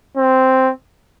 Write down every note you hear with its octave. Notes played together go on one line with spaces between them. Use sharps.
C4